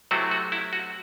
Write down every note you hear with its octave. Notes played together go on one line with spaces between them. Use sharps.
C3 F#3 A3 C4 E4 F#4
F#4
E4
F#4